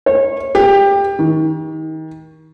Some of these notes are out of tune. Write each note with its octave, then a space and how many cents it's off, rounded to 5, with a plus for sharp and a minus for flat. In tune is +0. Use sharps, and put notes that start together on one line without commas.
C#5 -30
G4 +20
D#3 +30